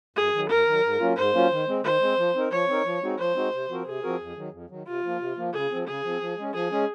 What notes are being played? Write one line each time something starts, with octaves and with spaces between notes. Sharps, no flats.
F#2 G#4
D#3 F#3
F#2 A#4
D#3 F#3
G#2
F#3 A#3 C#4 F4
G#2 C5
F#3 A#3 C#4 F4
D#3
G#3 C4
D#3 C5
G#3 C4
F3
C4 D#4 A#4
F3 C#5
C4 D#4 A#4
F3
G#3 C4 D#4 F#4
F3 C5
G#3 C4 D#4 F#4
C3
F3 C4 F#4 A#4
C3 G#4
F3 C4 F#4 A#4
F2
D#3 F#3
F2
D#3 F#3
C3 F4
F3 A#3
C3
F3 A#3
C#3 G#4
F3 C4
C#3 G#4
F3 C4
F3
G#3 C#4
F3 G#4
G#3 C#4